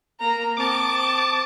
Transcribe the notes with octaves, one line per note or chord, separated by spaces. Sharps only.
A#3 A#5
C4 A5 D6